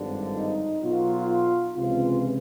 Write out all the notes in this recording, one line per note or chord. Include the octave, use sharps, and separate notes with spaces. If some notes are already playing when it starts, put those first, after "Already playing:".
Already playing: G#1 G2 D3 F3 D4
D#4
B1 B2 F#3 F4
C#2 C3 E3 F4